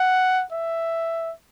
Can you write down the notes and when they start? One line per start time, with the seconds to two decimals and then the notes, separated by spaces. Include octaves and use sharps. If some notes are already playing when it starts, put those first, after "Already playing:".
Already playing: F#5
0.52 E5